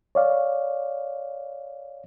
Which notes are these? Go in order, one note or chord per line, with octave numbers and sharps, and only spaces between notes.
C#5 D5 F5